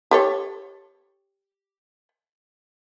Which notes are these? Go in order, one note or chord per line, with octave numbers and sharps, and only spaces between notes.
G4 A4 C#5